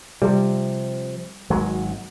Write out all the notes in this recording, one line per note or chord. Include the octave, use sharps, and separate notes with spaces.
C3 F3 G3
G#1 F#3 G#3